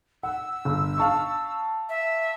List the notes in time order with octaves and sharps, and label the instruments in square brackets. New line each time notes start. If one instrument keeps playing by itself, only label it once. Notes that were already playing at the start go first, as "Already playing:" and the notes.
[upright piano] F#5 [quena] E6
[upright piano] G1
F5 A5 C#6
[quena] E5